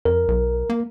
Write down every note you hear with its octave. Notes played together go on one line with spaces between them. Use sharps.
F2 A#4
B1
A#3